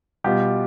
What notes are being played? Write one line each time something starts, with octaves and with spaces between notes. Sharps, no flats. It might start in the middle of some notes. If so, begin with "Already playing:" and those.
B2 G3 F4 G4